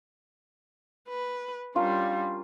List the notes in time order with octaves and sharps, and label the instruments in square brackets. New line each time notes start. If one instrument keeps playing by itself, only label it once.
[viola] B4
[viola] G3 D4 [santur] C#4 F4 A#4